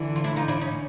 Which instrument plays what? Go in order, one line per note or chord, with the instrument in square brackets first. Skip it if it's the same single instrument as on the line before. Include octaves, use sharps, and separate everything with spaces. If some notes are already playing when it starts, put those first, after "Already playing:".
Already playing: [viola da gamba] D3 E3
[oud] F4
D4 E4
D#4 F4
D4 E4
C#4 D#4